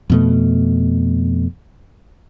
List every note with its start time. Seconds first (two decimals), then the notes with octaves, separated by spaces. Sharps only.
0.10 F2 B2 A3